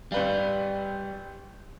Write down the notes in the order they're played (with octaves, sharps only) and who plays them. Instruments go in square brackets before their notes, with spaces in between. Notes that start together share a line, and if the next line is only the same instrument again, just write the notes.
[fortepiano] G#1 B4 F5 [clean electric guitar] G3